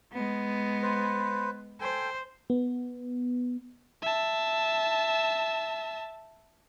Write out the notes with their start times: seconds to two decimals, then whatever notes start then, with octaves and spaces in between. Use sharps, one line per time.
0.13 G#3 B3
0.82 B4 C5
1.81 A4 C5 G5 G#5
2.50 B3
4.02 E5 A5